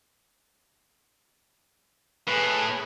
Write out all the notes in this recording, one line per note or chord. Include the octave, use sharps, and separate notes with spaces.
A2 G#4 B4